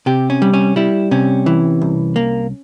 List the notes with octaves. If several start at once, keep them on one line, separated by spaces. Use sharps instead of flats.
C3 G4
C#4
G3
C#4
G3 E4
C3 C#4
E3
C2
A#3